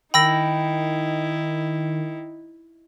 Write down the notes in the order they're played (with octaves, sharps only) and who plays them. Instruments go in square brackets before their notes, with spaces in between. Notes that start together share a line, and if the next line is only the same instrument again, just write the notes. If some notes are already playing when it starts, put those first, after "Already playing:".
[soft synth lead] D#3 [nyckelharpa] D#4 E4 [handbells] G5 [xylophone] B5 E6 A#6